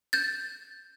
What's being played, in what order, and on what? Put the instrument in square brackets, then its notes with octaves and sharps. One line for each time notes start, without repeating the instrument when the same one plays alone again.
[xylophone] G6 A6